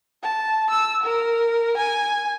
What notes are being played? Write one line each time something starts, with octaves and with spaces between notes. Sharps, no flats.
A5
E6
A#4
G#5